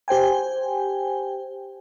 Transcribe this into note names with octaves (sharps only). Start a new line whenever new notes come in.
G4 C5 G5 G#5